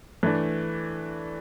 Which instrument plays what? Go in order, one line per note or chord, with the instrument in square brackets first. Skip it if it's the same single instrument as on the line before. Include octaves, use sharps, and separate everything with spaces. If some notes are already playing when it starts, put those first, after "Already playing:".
[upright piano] E3 A3 D4